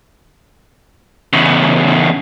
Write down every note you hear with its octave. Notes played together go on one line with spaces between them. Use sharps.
E2 C#3